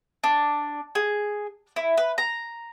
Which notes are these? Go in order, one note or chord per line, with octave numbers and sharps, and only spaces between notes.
D4
G#4
E4
B4
A#5